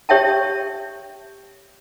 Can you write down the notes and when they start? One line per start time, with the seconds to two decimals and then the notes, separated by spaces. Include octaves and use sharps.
0.09 G4 C#5 E5 G5 A5